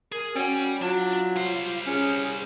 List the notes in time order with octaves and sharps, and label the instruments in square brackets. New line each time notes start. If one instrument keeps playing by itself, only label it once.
[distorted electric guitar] G#4 [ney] A#4
[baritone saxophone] C#4 [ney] F#4 [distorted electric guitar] D5 G5
[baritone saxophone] F#3 [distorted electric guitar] D4 [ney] F4
[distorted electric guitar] G3 C5
[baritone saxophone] C#4 [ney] G#4